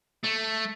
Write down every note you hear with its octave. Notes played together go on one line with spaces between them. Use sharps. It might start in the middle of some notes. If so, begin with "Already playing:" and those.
A3